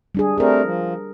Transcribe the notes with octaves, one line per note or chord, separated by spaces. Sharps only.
G3 D4 G#4
G3 A3 C4 G#4 A#4
F3